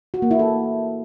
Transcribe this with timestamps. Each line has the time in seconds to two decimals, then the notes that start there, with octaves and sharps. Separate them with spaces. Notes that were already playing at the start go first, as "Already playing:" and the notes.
0.14 F#4
0.22 A#3
0.31 E4
0.39 A4